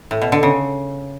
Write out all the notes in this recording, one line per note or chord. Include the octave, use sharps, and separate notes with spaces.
A2
B2
D3
C#3